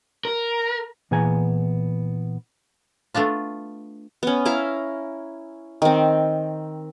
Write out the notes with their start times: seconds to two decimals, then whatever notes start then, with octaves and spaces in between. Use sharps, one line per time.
0.25 A#4
1.11 A#2 E3 B3 G#4 G#5 A#5
3.14 A3 B3 D4 F4
4.23 B3 C#4
4.45 E4 E5 F5 A#5
5.82 D#3 C4